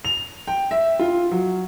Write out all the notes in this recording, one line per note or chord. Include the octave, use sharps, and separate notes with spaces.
F7
G5
E5
F4
F#3